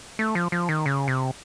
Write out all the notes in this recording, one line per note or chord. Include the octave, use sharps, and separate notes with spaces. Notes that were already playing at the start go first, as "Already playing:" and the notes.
A3
F3
F3
D#3
C#3
C3